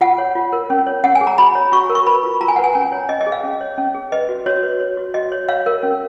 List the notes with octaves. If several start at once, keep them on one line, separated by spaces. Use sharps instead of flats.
F4 F#5
C#5
F4
A#4
C#4
C#5
C#4 F#5
G#5
G#4
A#5
F#4 B5
C#5
F#4 C#6
A#4
C#6
B4 B5
F4
F4 A#5
G#5
B4 F#5
G#5
C#4 G#5
C#5
C#4 D#5
D#5
G#4
F5
C#4
C#5
C#4
G#4
B4 D#5
F#4
F#4 C#5
B4
C#5
F#4
F#4 D#5
C#5
C#5 F5
A#4
C#4